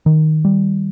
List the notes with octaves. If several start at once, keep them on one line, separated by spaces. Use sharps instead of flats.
D#3
G3